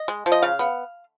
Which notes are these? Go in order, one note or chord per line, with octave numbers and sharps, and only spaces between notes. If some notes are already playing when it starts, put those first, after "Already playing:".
Already playing: D#5
G#3
F3
D#5
C#3 F5
B3